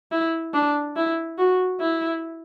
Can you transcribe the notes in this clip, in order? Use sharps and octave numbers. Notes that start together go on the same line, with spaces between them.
E4
D4
E4
F#4
E4